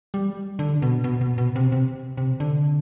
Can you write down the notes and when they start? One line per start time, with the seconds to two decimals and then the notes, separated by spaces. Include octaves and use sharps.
0.14 G3
0.59 D3
0.82 B2
1.04 B2
1.21 B2
1.38 B2
1.56 C3
1.72 C3
2.17 C3
2.40 D3